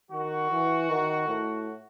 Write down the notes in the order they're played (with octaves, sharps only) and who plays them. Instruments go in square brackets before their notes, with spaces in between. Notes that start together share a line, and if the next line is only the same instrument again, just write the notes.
[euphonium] D#3 [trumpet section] F#4
[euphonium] E3
D#3
A2